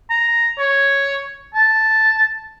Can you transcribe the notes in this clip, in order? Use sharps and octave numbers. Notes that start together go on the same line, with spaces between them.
A#5
C#5
A5